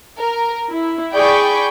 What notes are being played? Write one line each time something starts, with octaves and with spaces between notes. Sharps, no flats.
A#4
E4
G#4 D5 G5 B5 C#6 G6